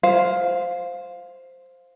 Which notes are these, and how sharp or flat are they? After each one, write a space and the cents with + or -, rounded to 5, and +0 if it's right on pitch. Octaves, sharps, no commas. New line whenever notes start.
C5 +0 F5 +10